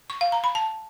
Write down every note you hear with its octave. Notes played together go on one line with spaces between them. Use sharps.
C#6
F5
A#5
B5
A5